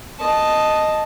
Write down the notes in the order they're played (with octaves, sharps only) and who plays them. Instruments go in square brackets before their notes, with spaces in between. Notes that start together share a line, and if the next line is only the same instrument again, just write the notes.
[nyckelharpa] D#5 A5